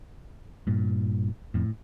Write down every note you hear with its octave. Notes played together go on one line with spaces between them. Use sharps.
G2 A#2
F2 A2